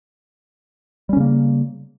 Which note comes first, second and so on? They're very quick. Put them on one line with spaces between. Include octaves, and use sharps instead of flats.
G3 C#4 C#3 A#3